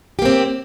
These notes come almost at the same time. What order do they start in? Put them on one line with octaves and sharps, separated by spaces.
G4 A#3 C4